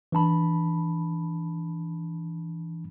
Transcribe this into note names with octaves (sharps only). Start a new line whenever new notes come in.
E3 D4 A5 B5